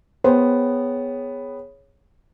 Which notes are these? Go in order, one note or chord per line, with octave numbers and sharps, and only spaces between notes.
B3 G#4 C5 C#5 G5